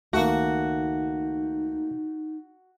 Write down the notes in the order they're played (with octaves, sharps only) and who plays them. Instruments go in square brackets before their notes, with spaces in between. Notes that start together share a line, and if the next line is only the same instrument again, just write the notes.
[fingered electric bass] C#2 D#3 [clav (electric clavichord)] A3 A#3 [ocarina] D#4 [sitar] F#4